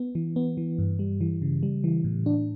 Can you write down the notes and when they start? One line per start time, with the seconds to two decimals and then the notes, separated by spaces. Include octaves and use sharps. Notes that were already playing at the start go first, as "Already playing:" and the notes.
Already playing: B3
0.15 E3
0.36 B3
0.57 E3
0.78 G2
0.99 G3
1.21 E3
1.42 C#3
1.63 G3
1.84 E3
2.04 A2
2.26 D4